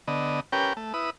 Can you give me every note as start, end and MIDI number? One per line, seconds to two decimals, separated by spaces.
0.08 0.40 50
0.08 0.40 59
0.08 0.40 75
0.52 0.73 61
0.52 0.73 67
0.52 0.73 70
0.52 0.73 71
0.52 0.73 79
0.77 0.93 57
0.94 1.10 64
0.94 1.10 71
0.94 1.10 87